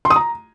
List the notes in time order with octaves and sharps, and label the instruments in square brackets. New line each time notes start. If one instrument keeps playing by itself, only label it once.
[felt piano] C6
D#6
A#5